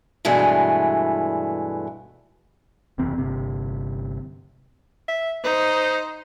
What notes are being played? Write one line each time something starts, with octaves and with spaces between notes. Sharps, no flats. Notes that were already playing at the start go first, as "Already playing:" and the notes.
G2 B2 E3 G#3 A3
F#1 E2 C3 C4
G1 C3
E5
D#4 C5